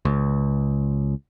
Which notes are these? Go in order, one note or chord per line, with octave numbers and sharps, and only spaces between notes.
C#2